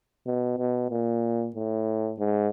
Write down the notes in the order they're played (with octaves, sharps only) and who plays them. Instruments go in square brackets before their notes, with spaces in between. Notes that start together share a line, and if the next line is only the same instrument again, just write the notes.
[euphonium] B2
B2
A#2
A2
G#2